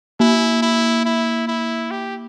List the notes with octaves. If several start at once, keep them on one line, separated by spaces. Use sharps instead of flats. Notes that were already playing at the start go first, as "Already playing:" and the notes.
A#3 E4
E4
E4
E4
G4